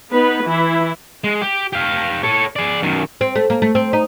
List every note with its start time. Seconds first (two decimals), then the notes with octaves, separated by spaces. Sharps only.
0.12 B3 D#4 B4
0.44 E3 E4
1.24 G#3
1.42 G4
1.73 G4 F5
2.23 A4 C#5
2.56 G#4 D5
2.82 F#2 D#3
3.21 C4
3.36 A3
3.50 A#3
3.62 A3
3.75 C4
3.93 D#4